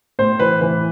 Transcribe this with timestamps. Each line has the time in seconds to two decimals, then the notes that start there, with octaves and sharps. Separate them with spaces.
0.19 A2 C5
0.39 E3 B4
0.61 E3 B4